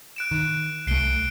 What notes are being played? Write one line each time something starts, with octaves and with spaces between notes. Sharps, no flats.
F#6 D7 E7
D#3
C2 A3 C7 D7 G7